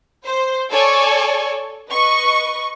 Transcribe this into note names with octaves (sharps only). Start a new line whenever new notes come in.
C5
A4 C#5 D5 G#5 A5 C#6
B4 D#5 C#6